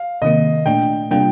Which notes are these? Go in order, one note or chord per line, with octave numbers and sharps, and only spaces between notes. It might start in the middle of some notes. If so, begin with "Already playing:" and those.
Already playing: F5
C3 D#3 A#3 D#5
A#2 A3 D4 G5
C3 G3 A#3 D4 F4 G5